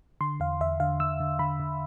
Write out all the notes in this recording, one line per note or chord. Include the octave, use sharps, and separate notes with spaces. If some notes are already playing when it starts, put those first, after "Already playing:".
D3 C6
E2 F5
E2 E5
D3 F5
D3 E6
D3
D3 B5
D3